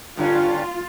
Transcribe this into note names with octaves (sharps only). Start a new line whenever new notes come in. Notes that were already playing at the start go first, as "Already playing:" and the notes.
G2 D3 C#4 F4